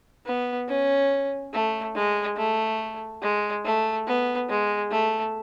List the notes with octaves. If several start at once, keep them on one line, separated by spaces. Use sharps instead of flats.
B3
C#4
A3
G#3
A3
G#3
A3
B3
G#3
A3